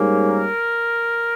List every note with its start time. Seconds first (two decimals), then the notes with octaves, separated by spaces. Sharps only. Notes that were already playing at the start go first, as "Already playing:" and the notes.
Already playing: G#2 G3 A#3 C#4
0.27 A#4